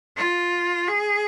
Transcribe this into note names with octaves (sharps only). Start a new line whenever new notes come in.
F4
G#4